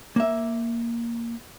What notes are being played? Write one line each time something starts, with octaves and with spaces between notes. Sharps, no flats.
A#3 E5